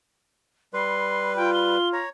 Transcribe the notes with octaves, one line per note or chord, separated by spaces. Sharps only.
G3 B4 C6
F4 G5
G7
C#5 A#5